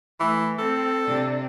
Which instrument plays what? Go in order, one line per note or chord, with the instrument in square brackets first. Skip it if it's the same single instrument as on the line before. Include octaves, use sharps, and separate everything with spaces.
[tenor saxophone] E3 [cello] A3
[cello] C4 [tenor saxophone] A4
[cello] C3 D4